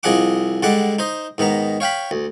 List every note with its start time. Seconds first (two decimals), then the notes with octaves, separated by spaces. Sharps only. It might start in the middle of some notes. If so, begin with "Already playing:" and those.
0.03 C2 F3 G#4 D#5 F#5 D6
0.63 D3 G3 G#3 F#5 D6
0.99 D#4 C5 D#5
1.38 G#2 D#3 B3 A#5
1.80 C#5 F5 G5 B5
2.11 D2